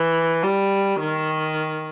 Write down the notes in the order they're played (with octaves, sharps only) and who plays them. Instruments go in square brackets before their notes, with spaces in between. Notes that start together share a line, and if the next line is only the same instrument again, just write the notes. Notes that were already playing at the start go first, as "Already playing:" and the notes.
Already playing: [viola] E3
G3
D#3